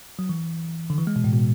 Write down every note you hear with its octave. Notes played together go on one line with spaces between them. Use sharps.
F#3
E3
D3
E3
G#3
B2
A2
B2